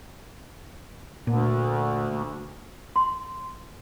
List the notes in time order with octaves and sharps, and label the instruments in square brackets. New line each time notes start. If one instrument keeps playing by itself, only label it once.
[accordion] D2 [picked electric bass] A#2
[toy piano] C6